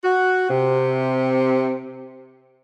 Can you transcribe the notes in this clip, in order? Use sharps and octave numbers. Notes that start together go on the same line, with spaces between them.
F#4
C3